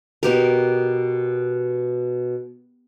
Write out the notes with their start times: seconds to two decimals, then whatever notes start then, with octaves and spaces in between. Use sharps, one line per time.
0.23 B2 G4 A#4